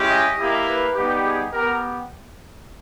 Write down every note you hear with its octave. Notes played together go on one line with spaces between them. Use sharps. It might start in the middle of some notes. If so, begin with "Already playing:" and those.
Already playing: G#3 C#4 E4 G4
D#5
A#3 E4 G4
B4
G3 B3 D#4 G4
G#4
B3 G4 A#4